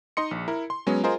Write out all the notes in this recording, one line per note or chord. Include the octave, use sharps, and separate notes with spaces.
D#4 D#5 C6 C#7
A#1
E4 A#4
C6
F#3 G#3 B3 C#4
F4 G#4 A#4 C5 D#5